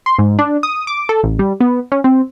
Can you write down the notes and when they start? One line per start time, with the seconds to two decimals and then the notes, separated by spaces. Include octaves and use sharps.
0.06 C6
0.19 G#2
0.39 D4
0.63 D#6
0.87 D6
1.09 A4
1.24 A1
1.39 G3
1.60 B3
1.92 C#4
2.04 C4